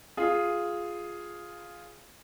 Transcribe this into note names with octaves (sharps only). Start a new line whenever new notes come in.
F4 G#4